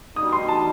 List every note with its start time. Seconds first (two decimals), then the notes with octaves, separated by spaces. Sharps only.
0.16 B2 G3 D#4 D#6
0.33 C6
0.48 A5